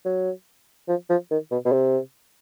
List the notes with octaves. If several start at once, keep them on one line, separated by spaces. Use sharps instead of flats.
F#3
F3
F3
D#3
B2
B2
C3